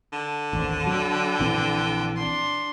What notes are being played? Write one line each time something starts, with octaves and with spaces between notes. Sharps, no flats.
D3
A1 D#2 C4 D4
F#3 D4 G5
A#1 E3 C4
D4 C6